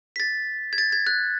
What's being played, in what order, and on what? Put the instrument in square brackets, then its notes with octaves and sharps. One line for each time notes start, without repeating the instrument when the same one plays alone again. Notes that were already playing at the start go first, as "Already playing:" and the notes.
[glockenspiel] B6
A6
G#6
A6
G#6
F#6